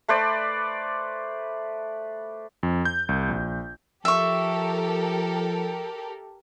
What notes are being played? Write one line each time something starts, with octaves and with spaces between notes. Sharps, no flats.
A3 B4 C5 D5
F2
G6
C2
A#1
F3 G4 A4 A#4 E5 C#6